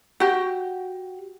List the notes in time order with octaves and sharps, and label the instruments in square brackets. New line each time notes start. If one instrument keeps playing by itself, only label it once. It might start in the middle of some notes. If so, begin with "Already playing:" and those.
[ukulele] F#4 G4